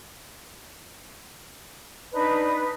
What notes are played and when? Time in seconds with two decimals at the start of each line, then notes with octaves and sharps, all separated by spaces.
2.11 D4 D#4 B4